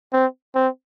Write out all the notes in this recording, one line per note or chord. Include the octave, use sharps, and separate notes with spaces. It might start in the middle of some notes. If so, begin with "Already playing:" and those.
C4
C4